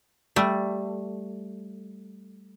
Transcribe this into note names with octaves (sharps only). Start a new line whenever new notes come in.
G3 A3